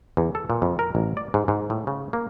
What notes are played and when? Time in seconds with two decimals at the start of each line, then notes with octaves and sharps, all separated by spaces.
0.17 E2
0.35 A4
0.50 A#2
0.62 F2
0.79 A#4
0.95 A1
1.17 D5
1.34 G#2
1.48 G#2
1.70 A2
1.87 C#3
2.13 A#3